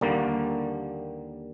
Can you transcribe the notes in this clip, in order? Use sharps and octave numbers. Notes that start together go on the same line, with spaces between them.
D#2 D3 G3 A#3